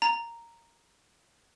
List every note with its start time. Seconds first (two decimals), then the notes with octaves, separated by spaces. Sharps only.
0.02 A#5